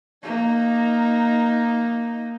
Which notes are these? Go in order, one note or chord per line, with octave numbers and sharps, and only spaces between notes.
A#3 D#4